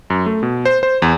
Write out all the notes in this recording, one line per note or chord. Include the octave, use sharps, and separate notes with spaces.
F#2
A3
B2
C5
C5
E2